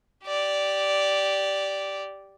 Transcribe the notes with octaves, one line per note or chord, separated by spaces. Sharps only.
G4 D5